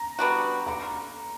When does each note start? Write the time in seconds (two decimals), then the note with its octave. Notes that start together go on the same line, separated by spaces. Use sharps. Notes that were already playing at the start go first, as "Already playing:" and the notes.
Already playing: A#5
0.19 G3 B3 D4 F#4
0.67 D3 A#5